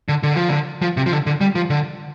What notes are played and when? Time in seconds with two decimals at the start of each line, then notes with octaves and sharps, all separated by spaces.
0.09 D3
0.23 D3
0.36 F3
0.49 D3
0.82 F3
0.97 C3
1.06 F3
1.12 D3
1.26 D3
1.41 G3
1.55 F3
1.70 D3